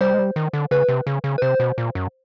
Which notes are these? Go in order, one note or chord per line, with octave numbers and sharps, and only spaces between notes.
G3 C5
G#3
G3
D#3
D3
C#3 B4
C3
C#3
C#3
B4
C3 C5
B2
A#2
F#2